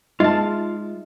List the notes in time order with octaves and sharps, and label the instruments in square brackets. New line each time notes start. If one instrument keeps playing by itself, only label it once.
[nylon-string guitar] G#3 [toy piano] D#4 D#5 E5 [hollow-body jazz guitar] F4 A5